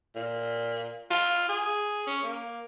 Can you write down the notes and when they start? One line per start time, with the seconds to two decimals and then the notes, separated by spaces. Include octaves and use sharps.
0.15 A#2
1.11 F4
1.49 G#4
2.07 C#4
2.23 A#3